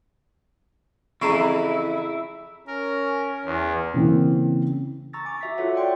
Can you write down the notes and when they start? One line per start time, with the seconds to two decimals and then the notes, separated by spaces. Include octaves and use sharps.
1.22 F2 C#3 E3 E4 A#5 C#6
2.67 C#4 A#4
3.45 E2
3.94 C#3 E3 A#3 C4
5.13 A#5 C#6 E6 A6 A#6
5.25 G#5 D6
5.41 F#4 E5 B6
5.57 F4 A4 C#5 E5 F#5
5.74 C#5 D5 F#5 G5 C6